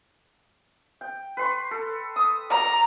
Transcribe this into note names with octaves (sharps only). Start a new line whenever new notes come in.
G5
B4 C6 C#6
A4
D#6
D5 A#5 D6